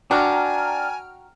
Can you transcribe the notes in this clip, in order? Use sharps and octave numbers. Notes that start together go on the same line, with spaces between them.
D4 F#4 G5 G#5 A#5 F6